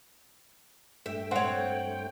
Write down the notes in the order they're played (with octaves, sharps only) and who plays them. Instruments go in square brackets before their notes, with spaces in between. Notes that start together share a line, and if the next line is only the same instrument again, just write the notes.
[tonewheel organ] G2 A3 G5 [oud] E5
[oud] C4 C#5 [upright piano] F#5